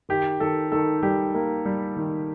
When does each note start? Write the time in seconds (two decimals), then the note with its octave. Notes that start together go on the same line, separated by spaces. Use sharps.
0.09 D#3 G4
0.40 D#3 A4
0.72 D#3 A4
1.02 G3 G4
1.34 A#3
1.65 G3
1.97 D#3